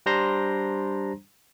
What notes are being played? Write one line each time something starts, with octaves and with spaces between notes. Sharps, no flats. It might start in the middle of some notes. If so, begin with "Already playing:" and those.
G3 D4 C5 A#5 C6 A#6